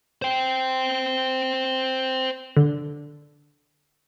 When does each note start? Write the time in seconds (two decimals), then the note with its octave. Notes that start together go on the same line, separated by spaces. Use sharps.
0.22 C5 G5
2.57 D3